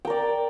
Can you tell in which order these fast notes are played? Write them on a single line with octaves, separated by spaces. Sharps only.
G5 A#4 D5